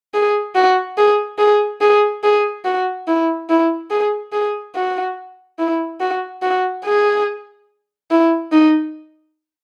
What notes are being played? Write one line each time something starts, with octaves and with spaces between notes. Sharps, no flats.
G#4
F#4
G#4
G#4
G#4
G#4
F#4
E4
E4
G#4
G#4
F#4
E4
F#4
F#4
G#4
E4
D#4